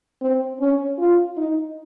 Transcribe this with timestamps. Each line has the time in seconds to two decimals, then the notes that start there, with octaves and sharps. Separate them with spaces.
0.21 C4
0.60 C#4
0.98 F4
1.37 D#4